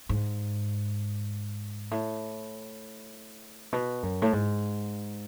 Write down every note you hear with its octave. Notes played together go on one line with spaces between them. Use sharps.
G#2
A2
B2
F#2
A2
G#2